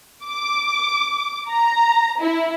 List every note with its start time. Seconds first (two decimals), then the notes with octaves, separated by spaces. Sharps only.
0.25 D6
1.50 A#5
2.21 E4